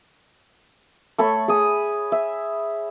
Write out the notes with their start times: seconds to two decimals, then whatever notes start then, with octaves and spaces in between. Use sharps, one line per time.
1.18 A3 A4 C#5 B5
1.48 G#4 D#6
2.12 E5